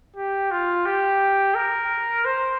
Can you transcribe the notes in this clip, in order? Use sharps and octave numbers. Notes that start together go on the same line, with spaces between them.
G4
F4
G4
A#4
C5